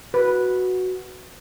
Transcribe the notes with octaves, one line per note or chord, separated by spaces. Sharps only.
F#4 B4